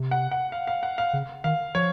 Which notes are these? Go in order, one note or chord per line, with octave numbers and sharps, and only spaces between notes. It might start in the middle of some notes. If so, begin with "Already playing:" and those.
Already playing: C3
F#5
F#5
F5
F5
F#5
F5
C#3
D#3 F5
F3 C#5